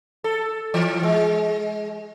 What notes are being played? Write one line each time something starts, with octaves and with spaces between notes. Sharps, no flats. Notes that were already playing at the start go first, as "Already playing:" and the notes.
A4
E3
G#3